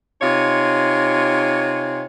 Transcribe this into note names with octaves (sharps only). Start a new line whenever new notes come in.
C3 D#4 F4 C#5 G#5